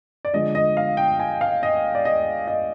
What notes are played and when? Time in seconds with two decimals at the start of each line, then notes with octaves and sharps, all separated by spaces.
0.25 D5
0.33 D3 F3 G#3 D#5
0.55 D#5
0.77 F5
0.97 G5
1.20 G#5
1.41 F5
1.63 D#5
1.95 D5
2.05 D#5
2.48 D#5